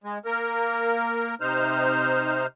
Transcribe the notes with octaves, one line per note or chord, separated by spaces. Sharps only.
G#3
A#3 A#4
C3 D#4 C5 F6